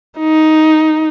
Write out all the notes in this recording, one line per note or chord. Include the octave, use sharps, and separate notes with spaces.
D#4